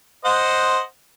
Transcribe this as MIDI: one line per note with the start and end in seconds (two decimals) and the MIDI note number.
0.25 0.80 72
0.25 0.80 75
0.25 0.80 78